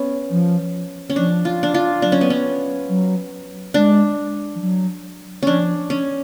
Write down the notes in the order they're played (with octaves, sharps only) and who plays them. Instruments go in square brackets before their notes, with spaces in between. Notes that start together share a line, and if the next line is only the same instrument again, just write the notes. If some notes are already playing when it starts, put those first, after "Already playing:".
Already playing: [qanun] B3 C#4
[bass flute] F3
[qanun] C#4
[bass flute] F3 [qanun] D4
[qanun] F4
D4
F4
[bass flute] F#3 [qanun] D4
[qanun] C#4
B3
C#4
[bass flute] F#3
[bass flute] G#3 [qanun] D4
[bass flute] F3
F#3
[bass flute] F3 [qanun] C#4 D4
[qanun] C#4